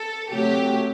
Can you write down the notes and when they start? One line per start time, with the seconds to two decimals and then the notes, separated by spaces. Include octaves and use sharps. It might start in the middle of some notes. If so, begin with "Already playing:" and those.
Already playing: A4
0.30 C3 F#3 A3 G4